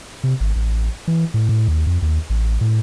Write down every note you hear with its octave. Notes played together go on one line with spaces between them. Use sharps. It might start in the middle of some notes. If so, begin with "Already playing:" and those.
C3
G#1
A1
E3
A2
A2
D#2
F2
D#2
A1
A2